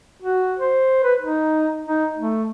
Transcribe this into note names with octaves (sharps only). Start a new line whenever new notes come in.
F#4
C5
B4
D#4
D#4
A3